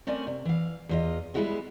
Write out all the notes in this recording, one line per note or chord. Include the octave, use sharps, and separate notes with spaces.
A3 C4 C#4 A#4 D5 G#5
C3
E3 F5
E2 F4 D#5
G3 G#3 B3 E4 F#4 G#4